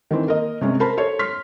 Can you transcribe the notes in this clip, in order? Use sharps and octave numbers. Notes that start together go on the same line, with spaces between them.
D#3 E3 C4
A#3 A#4 D#5
C3 G#3 C#4
A#4 C5 A5 B5
A4 C5 C#5
C6 F6 B6